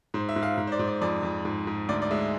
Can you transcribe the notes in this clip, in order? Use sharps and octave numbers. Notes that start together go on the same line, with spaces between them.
G#2 C5
E5
G#2
F5
G#2
C5
D5
G#2
D5
F2 D5
F2
G#2
G#2
D2 D5
D5
G#3 E5